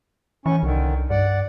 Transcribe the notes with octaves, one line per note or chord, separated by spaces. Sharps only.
A2 E3 C#4 C#6
C2 D3 D#3
G2 D5 F#5